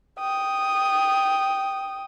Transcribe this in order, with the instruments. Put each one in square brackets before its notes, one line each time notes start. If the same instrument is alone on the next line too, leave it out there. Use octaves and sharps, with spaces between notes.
[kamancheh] G5 D#6